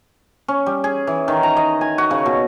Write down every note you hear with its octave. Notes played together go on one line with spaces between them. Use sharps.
C#4
G3
G#4
E3
D#3
A#5
D#5
G#5
F#4
C#3
B2